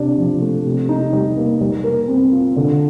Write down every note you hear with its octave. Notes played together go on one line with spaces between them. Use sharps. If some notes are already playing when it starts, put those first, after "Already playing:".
Already playing: C3 D4
F3
A3
C3
D#4
G3
A#3
G3
A#4
C4
F4
D3